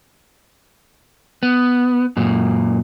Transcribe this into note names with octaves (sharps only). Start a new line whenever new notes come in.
B3
F#2 A#2